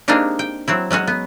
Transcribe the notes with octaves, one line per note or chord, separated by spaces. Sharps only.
G#3 A#3 C4 D4 D#4 G4
G5
F#3 C4 E4
F#3 G#3 C#4 F#4
B3